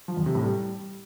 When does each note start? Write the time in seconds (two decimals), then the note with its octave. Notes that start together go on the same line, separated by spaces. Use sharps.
0.08 F3
0.17 E2
0.26 C3
0.35 A2
0.44 G3